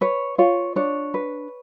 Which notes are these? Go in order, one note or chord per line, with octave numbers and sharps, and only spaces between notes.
B4 C#5
F4 C#5
D4 C#5
B4